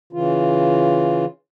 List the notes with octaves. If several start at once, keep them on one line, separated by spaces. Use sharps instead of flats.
C#3 E3 F4